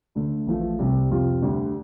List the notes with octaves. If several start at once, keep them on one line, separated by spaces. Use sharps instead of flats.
D2 D3 A3
A1 A2 F3 A3
C2 C3 G3
F2 C3 G3 F4
D2 D3 G3